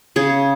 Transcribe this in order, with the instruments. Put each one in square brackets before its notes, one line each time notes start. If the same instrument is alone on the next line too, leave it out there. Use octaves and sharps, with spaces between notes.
[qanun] C#3 G#4